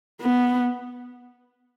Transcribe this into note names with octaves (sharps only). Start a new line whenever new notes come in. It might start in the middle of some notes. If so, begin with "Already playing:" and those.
B3